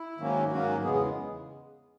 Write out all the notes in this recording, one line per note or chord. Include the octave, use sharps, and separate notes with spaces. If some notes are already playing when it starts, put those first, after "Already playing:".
Already playing: E4
G#2 D#3 F#3 A#3 C#4
G#2 D#3 F#3 A#3 C#4 F#4
E2 C#3 G#3 B3 G#4
G#4